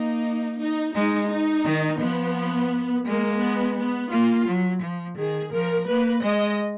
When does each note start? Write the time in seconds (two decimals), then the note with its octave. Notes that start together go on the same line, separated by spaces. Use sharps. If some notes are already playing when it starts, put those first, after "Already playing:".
Already playing: A#3 D#4
0.59 D#4
0.94 G#3 D#4
1.29 D#4
1.65 D#3
2.00 F3 B3
3.06 G#3 A#3
3.41 B3
3.77 B3
4.11 A#3 F4
4.48 F#3
4.82 F3
5.17 D#3 G#4
5.53 F3 A#4
5.88 A#3 B4
6.23 G#3 D#5